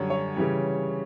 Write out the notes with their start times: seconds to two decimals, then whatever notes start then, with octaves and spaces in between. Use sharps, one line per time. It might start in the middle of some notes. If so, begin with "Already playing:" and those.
Already playing: F#2 D3 G3 C#5
0.10 C#5
0.36 C#3 E3 G3